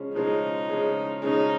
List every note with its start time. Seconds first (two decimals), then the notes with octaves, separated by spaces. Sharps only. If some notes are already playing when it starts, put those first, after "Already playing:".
Already playing: C#3 F3 G#3 C#4
0.15 C#3 F3 G#3 C#4 D#4
0.69 C#3 F3 G#3 C#4
1.22 C#3 F3 G#3 C#4 D#4